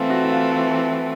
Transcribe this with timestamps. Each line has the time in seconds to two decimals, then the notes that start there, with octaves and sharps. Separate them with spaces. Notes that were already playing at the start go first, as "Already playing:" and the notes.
Already playing: E3 A3 C4 F4
0.10 F#4
0.23 E4
0.31 F4
0.53 F4